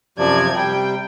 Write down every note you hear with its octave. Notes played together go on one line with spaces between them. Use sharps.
F#2 C3 F3 D5 G#6
C3 G3 G5